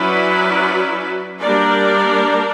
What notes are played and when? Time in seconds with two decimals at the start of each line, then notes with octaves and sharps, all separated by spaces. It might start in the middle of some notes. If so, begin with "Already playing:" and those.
Already playing: F#3 C#4 E4 B4 D5
1.41 G3 A#3 D4 A#4 D5